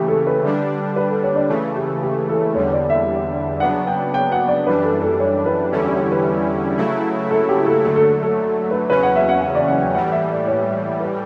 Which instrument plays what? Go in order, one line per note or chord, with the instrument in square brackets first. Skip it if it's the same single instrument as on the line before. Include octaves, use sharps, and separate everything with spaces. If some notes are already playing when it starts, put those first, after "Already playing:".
Already playing: [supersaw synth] C#3 E3 A3 [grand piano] G4
[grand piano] A4
B4
[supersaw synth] D3 G3 D4
[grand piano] B4
A4
C#5
D5
[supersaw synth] C#3 E3 A3
[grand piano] G4
G4
A4
[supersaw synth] E2 D3 G3 [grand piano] C#5
[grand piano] D5
E5
[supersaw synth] C#3 F#3 B3 D4 [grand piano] F#5
[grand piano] G5
G5
F#5
D5
[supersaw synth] F#2 E3 G3 D4 [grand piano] B4
[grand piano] A4
A4
C#5
B4
[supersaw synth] E2 D3 G3 C#4 E4 [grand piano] A4
[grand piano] G4
G4
B4
[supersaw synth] C#3 F#3 A3 E4
[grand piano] A4
G4
A4
[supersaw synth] D3 F#3 A3 [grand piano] A4
[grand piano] A4
A4
A4
B4
[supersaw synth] E2 C#3 F#3 C#4 [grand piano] B4
[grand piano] F#5
E5
F#5
F#5
D5
F#5
G5
[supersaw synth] A2 E3 G3 [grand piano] F#5
[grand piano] E5
D5
C#5
B4